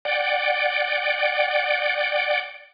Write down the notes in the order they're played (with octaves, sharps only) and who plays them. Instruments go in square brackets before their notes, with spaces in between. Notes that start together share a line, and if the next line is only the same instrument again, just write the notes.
[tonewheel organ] D5 F#5 G5